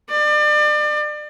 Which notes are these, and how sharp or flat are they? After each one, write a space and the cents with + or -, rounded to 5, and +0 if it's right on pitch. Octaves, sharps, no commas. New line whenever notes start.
D5 +35